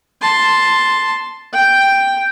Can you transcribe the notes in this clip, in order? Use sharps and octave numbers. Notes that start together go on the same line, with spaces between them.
A5 C6
G5